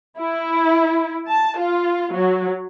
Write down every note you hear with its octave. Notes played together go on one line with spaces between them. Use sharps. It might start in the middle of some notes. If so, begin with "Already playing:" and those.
E4
A5
F4
F#3